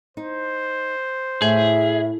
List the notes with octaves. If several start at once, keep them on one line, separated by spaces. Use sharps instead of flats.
D#4 C5
A2 G#4 E5